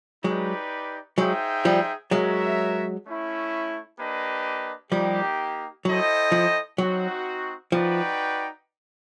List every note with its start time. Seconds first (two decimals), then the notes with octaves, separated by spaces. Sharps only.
0.24 F#3 G#3 D#4 G4 B4 D5
1.18 F#3 G#3 D#4 G#4 C5 E5 G5
1.65 F3 G3
2.11 F#3 G#3 F#4 A#4 C#5 E5
3.05 A3 C#4 E4
3.99 A#3 D4 G4 B4 D#5
4.91 F3 G3 A#3 D#4 G4
5.85 F#3 E4 A4 C5 D#5 G5
6.32 F3
6.78 F#3 C4 D#4 F#4
7.72 F3 D#4 F#4 B4 D5 G5